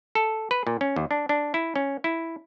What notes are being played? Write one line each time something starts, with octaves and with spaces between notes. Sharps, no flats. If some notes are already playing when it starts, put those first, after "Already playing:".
A4
B4
A#2
C#4
D#2
D4
D4
E4
C#4
E4